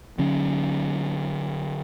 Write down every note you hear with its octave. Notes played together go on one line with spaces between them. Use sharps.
D3 F#3 C#4